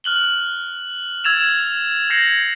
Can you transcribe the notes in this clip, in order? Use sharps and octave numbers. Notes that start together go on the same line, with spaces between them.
F6 F#6 F#7 G7
E6 G#6 A6 E7 F7
G6 G#6 A#6 C7 C#7 F#7